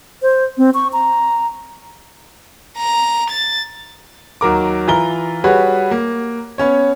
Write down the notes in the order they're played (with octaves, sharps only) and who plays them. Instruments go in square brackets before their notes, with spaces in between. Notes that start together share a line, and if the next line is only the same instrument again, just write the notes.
[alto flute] C5
C4
C#6
A#5
[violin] A#5
A6
[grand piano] D#2 F#3 A#4 D6
E3 F4 A#5 G7
G3 F#4 G#4 B4 C#5
A#3
B3 C#4 C#5